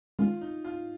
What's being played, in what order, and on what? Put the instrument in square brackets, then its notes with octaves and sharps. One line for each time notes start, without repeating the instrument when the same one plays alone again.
[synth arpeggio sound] D#3 G#3 C#4 [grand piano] F4
[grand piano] D#4
F4